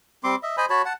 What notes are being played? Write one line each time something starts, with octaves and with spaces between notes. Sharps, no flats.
G3 C4 C6 D6
D#5 E5
C5 D#5 G#5 B5
F#4 C#5 A5 B5
F#5 A5